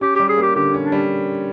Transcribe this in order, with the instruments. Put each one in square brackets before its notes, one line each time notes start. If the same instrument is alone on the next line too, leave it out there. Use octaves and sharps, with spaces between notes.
[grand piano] C#4 [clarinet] G4
[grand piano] G3 [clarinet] G4
[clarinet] G#4
[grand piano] A#3 [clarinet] G4
[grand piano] D3 [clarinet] G4
[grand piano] C#4
[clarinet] D4
[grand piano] G3